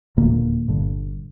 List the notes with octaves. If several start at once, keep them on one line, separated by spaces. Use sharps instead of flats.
E1 D#2 A#2 D3 A#3
G1 G2 D3